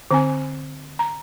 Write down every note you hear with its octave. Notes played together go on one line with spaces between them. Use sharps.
D3 C4 G#5
A#5